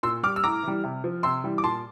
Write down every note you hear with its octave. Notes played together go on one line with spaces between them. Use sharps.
A#2 C6 E6
G3 D6 F6
E6
A2 A#5 D6
E3 G3
C3
F3
C3 C6 E6
E3 G3
D6
A#2 A5 C6